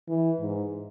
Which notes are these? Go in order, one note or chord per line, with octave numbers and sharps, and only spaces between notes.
E3
G#2